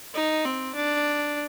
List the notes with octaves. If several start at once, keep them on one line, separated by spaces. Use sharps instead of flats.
D#4
C4
D4